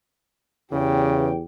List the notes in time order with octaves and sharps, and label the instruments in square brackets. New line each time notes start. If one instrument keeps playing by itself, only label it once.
[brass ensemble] E2 [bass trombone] C#3 [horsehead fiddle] G4 G5